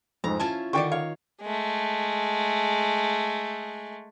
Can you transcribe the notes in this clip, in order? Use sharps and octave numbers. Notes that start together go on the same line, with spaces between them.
F2 G#2 A#5
C#4 E4 F4 A5
D3 D#3 D4 D5 G5 C#6
C#5 F5
G#3 A3